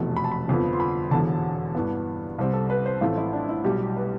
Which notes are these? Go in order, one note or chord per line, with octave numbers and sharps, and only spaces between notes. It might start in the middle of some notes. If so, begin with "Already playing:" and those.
Already playing: F1 E2 B2 A3
B5
A5
B5
G1 F2 D3 F3 B3
C6
B5
E1 E2 D3 A5
G2 E3 B3
C2 C3 G3 C4
A4
B4
C5
A1 A2 F3 A3 C4 F4
E4
D4
E4
B1 B2 G3 G4
B4